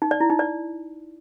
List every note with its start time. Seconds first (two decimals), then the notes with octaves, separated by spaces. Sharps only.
0.02 D#4
0.11 D5
0.20 E4
0.30 D#4
0.39 D5